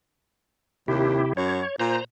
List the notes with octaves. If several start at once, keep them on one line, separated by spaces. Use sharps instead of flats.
D#2 C3 E4 G4
F#2 C#5
A#2 C5 A#5